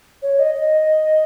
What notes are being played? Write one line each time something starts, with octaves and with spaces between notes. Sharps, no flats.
C#5
D#5
D#5